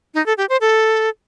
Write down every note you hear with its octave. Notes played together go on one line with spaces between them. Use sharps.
D#4
A4
G4
C5
A4